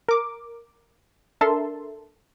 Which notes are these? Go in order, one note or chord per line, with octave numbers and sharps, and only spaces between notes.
A#4 D6
D4 A4 A#4 E5 A5 C6